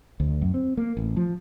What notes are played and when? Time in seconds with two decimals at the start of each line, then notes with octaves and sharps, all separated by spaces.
0.20 D2
0.42 F#2
0.54 C4
0.77 A#3
0.97 A1
1.17 F3